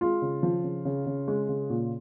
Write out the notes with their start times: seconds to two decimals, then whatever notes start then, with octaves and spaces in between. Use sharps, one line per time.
0.01 G#3 F4
0.22 C#3
0.43 F3
0.64 C#3
0.85 C#3
1.06 C#3
1.28 G#3
1.49 C#3
1.70 A#2